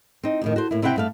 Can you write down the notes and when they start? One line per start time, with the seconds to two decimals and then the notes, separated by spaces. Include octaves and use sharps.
0.23 C4 D#4
0.41 F2 A2 D#3
0.56 F#4 A4 C5
0.71 A2 A#3 E4
0.82 C3 C4 E4 B4 F#5 G5
0.96 G2 A3 F5